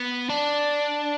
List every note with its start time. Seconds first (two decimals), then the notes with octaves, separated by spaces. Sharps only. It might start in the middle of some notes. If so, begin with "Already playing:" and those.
Already playing: B3
0.29 D4